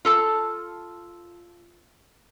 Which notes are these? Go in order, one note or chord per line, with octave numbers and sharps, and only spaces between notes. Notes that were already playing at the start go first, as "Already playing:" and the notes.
F4 A4 A5